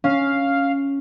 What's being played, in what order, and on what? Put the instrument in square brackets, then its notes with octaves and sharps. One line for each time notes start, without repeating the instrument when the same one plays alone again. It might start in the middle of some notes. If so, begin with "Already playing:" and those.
[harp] C#4 [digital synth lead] F5